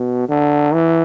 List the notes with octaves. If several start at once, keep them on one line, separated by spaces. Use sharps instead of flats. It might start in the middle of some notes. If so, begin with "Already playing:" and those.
Already playing: B2
D3
E3